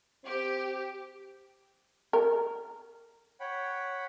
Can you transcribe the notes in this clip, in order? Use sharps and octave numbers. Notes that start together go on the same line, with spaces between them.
C4 G4
A#4
C#5 F#5 G5 B5